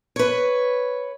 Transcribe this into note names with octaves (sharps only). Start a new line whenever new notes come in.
B4 C#5